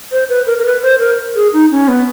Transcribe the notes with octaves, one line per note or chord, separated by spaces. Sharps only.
C5
B4
A#4
A#4
B4
C5
A#4
G#4
D#4
C#4
B3